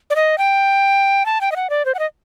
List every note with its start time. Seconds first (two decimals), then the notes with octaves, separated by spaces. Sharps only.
0.10 D5
0.16 D#5
0.38 G5
1.26 A5
1.41 G5
1.52 D#5
1.56 F#5
1.70 D5
1.85 C5
1.95 F#5
1.99 D#5